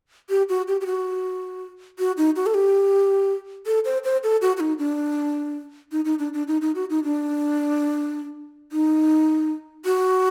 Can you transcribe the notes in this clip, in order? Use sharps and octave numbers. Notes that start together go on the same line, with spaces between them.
G4
F#4
G4
G4
F#4
F#4
D#4
F#4
A4
G4
A4
C5
C5
A4
F#4
F#4
D#4
D4
D#4
D#4
D4
D4
D#4
D#4
F#4
D#4
D4
D#4
F#4